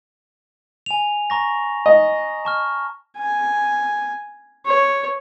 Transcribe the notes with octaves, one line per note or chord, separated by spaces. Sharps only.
G#5 F7
A#5 C#6 A#6
D#5
A5 C#6 F6
G#5
C#5